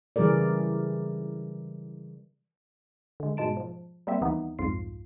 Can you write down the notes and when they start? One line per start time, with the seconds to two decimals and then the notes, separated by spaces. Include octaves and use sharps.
0.16 C#3 E3 G3 G#4 A#4 D5
3.20 D3 G#3
3.37 G#2 B2 G#3 A5 D7
3.57 F3
4.07 G3 A#3 C4 E5
4.21 D#2 E3 B3 D#4
4.59 C2 F2 G#2 F4 C7